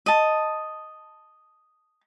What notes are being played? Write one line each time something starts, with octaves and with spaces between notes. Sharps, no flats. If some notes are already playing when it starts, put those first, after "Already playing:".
D#5 A5